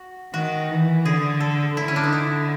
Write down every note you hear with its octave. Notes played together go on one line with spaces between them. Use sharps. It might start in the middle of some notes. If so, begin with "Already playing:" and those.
Already playing: F#4
D#3 F#4
E3
D3 G#4
A4
D3 E4
C#4
D4
D#4
E4